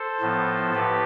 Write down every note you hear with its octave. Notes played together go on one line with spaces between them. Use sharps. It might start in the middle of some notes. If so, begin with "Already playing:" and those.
Already playing: A4 C5
A2 F3 B3
A2 G4 B4